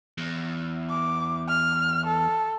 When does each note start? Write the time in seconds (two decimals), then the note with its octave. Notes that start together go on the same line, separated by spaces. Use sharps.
0.18 E2
0.90 D6
1.49 F6
2.06 A4